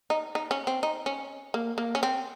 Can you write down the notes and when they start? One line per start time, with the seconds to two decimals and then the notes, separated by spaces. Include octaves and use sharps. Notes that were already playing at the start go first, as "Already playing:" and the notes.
0.10 D#4
0.35 D#4
0.51 C#4
0.67 C4
0.83 D#4
1.06 C#4
1.54 A#3
1.78 A#3
1.95 C#4
2.03 C4